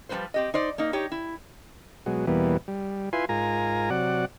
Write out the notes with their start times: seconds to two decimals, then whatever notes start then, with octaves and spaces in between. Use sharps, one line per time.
0.09 F3 G3 G#3 C4 B4 C5
0.34 C4 G4 D#5
0.54 D#4 C5 D5
0.78 A#3 D#4
0.93 D#4 G4 C#5
1.12 E4
2.06 B2 F#3 G#3
2.27 E2 B2 E3 G3 A#3 B3
2.68 G3
3.13 E4 F4 B4 G#5 C6
3.29 G#2 F4 A#4 G#5 A#5
3.90 C3 F#3 D5 F#5